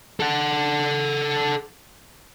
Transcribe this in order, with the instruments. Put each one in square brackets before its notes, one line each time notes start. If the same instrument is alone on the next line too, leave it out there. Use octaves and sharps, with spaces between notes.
[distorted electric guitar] A4 F#5